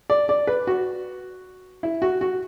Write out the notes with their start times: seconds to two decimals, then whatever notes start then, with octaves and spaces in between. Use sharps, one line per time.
0.10 D5
0.29 D5
0.47 B4
0.67 F#4
1.83 E4
2.02 F#4
2.21 F#4